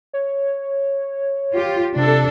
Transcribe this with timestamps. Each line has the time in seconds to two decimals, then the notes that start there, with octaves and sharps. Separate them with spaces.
0.13 C#5
1.54 F4 G4
1.96 C3 D4 A4